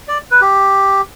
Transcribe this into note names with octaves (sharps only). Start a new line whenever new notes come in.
D5
B4
G4